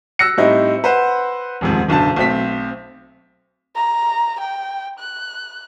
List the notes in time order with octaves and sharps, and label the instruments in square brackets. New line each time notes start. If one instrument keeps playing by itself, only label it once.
[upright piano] E6 F#6 A#6 C#7
A2 G3 C4 D#4 E4
B4 C5 F#5
D#1 F2 G#2
F#1 B1 D3 A5
B1 A3 C4 B6
[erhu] A#5
G5
F#6